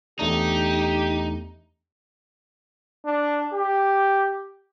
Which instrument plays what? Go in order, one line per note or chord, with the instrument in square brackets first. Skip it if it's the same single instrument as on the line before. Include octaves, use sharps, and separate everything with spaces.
[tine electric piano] E2 A3 D4 [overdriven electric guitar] D#4 [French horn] G4
[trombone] D4
G4